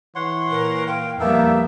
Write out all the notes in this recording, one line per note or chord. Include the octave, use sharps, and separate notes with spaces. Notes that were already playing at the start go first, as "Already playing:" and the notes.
E3 C#5 F#5 C6
A#2 A#4
F5 G5
F2 G3 A#3 B3 D#4 A4 E5